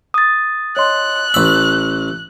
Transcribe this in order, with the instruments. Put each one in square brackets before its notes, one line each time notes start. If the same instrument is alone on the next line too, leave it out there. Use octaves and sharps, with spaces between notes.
[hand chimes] D#6 A6
[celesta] C#5 D#5 C6 [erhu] F#6
[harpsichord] A1 B5 [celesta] E6